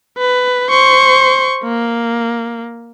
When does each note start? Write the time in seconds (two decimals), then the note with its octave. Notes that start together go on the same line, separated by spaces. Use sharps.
0.18 B4
0.70 C5 C#6
1.64 A#3